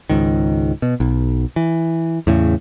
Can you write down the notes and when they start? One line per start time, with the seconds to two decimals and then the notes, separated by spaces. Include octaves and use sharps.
0.09 C#2 G#2 D#3
0.82 B2
1.00 B1
1.56 E3
2.27 E2 A2 C#3